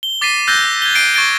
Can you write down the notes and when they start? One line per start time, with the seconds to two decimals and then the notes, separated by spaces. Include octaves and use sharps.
0.03 G7
0.21 D6 A6 B6 C7 D#7
0.47 E6 F#6 G6 A6 A#6 G7
0.82 G#6 G7
0.95 A6 C7 D7 D#7
1.14 C#6 G#6 A6 D7 G7